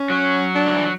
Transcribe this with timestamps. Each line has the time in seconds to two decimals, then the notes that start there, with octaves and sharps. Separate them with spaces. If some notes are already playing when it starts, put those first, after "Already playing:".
Already playing: C#4
0.10 F#3
0.55 D4
0.67 D3
0.74 E3
0.83 F#3